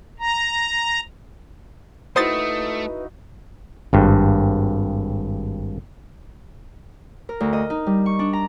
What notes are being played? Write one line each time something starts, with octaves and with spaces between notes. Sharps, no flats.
A#5
A3 D#4 E4 F#4 B4 C5 D#6 A6
G#1 G2
A#4
D2
D#5
D#4
G3
C#6
D4
A#5